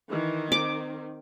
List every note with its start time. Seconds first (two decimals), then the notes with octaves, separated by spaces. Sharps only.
0.10 D#3 E3
0.52 C4 D6